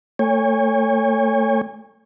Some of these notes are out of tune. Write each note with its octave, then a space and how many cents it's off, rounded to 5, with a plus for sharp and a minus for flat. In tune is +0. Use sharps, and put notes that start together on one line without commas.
A3 +25 C#5 +0 G#5 -40